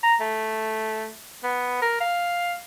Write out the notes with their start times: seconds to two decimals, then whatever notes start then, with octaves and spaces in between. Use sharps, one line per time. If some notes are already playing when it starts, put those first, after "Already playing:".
0.03 A#5
0.20 A3
1.43 B3
1.82 A#4
2.01 F5